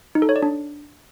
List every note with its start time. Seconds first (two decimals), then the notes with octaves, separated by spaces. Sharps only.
0.15 D#4
0.22 A4
0.29 C#5
0.36 D5
0.42 D4